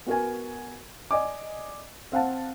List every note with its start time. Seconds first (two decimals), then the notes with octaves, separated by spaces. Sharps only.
0.06 B3 F#4 A#4 G#5
1.11 D5 D#5 G#5 D6
2.12 C4 F5 F#5 A5